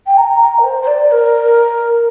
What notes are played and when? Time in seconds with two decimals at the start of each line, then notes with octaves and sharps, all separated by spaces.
0.06 G5
0.17 A#5
0.40 A#5
0.58 A#4
0.64 C5
0.82 C5
0.87 D5
1.11 A#4